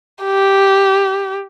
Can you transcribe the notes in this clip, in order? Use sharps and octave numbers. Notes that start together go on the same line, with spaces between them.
G4